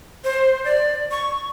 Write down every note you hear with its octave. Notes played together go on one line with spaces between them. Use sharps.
C5
D5
C#6